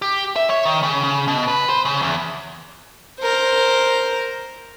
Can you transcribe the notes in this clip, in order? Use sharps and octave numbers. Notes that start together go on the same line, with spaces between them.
G4
E5
C#5
D#3
C#3
C#3
B2
B4
C5
C#3
E2
A#4 C5